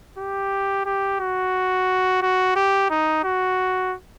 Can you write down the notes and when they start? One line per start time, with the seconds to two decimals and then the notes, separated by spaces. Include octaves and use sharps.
0.18 G4
0.86 G4
1.20 F#4
2.22 F#4
2.56 G4
2.90 D#4
3.24 F#4